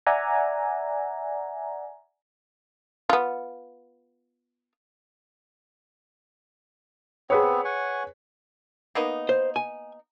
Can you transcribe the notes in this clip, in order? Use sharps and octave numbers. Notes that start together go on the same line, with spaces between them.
D5 E5 F#5 G#5 A#5
B3 F4
B3 C4 G#4 B4 C#5
F#5 G#5 C#6
A#3 B3 D#4
C5
G#5